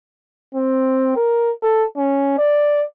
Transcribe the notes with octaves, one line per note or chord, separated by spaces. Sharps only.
C4
A#4
A4
C#4
D5